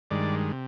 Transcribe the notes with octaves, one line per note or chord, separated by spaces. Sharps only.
G2 D#3 G#3 D5
C3